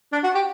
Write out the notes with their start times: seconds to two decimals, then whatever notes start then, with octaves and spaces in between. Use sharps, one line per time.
0.12 D4
0.23 F#4
0.35 G4